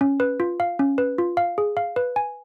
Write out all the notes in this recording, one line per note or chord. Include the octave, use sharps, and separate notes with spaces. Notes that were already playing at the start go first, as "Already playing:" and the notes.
C#4
B4
F4
F5
C#4
B4
F4
F5
G#4
F5
B4
G#5